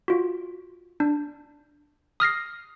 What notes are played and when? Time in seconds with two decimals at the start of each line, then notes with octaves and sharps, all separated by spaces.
0.08 F4 F#4
1.00 D4
2.20 D#6 F6 A#6 C7